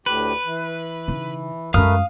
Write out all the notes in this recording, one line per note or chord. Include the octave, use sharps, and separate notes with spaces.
D2 A2 G4 B4
E3
C#3 D#4
F#2 G#3 A3 A#4 B4 F5 D#6 F6